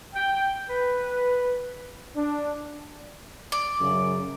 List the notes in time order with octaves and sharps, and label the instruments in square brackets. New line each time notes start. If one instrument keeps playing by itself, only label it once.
[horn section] G5
B4
[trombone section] D4
[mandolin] D5
[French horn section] F#2 C#3